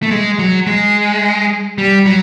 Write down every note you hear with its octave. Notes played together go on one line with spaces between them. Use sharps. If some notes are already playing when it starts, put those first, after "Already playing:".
A3
G#3
F#3
G#3
G3
F#3